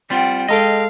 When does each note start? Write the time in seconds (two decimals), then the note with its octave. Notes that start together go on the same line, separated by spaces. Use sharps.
0.10 G3 C4 F4 F#5 G5
0.48 G#3 A4 D#5 F5 G5